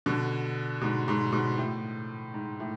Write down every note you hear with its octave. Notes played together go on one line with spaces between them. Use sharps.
B2 D3
G#2 B2
G#2 B2
G#2 B2
A2
G#2
A2